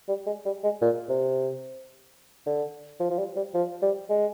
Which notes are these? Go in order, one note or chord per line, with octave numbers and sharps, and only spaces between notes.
G3
G#3
G3
G#3
A#2
C3
D3
F3
F3
G3
G3
F3
G3
G#3